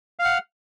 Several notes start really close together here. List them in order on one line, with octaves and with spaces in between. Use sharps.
F5 F6 F#5